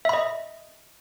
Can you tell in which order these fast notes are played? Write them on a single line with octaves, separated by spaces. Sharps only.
E5 B5 D#5